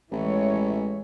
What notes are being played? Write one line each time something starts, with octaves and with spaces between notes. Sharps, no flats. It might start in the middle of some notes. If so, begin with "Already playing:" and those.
A1 E3 G#3 C#5